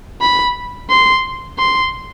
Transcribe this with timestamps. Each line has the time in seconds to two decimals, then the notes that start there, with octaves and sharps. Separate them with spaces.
0.21 B5
0.90 C6
1.58 C6